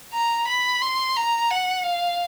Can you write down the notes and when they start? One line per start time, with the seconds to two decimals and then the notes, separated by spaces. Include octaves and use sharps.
0.13 A#5
0.48 B5
0.82 C6
1.16 A#5
1.50 F#5
1.85 F5